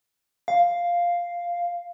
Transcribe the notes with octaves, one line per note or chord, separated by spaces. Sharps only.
F5